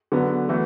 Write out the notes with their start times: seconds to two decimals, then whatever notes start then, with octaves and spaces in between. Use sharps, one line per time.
0.12 D3 F#3 B3
0.49 E3 A3 F#4